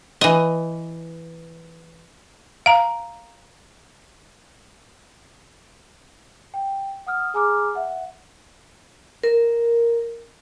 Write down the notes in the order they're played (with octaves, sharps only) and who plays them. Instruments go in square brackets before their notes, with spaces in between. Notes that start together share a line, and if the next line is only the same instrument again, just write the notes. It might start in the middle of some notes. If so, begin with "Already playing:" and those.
[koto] E3 D#5
[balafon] F5 A#5
[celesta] G5
F#5 D#6 F6
G#4 G#5 A#5 D6 F6
E5 F#5
[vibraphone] A#4